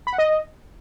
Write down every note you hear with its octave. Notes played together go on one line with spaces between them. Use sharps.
B5
F#5
D#5